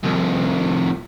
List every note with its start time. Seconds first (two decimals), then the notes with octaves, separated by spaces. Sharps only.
0.03 C2 F2